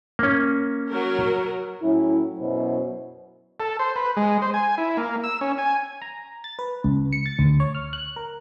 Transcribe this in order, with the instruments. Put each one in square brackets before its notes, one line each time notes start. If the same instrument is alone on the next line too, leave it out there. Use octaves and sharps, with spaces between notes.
[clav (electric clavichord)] A#3 C#4
[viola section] F#3 F#4 A#4
[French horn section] A2 F#3 C#4 E4
F#2 B2 F#3 E4 C5
[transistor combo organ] A4
C5
B4
G#3
C5
G#5
E4
A#3
E6
C#4
G#5
[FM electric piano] A#5
A6
B4
C#2
C#7
A6
D2
C#5
F6
F#6
A#4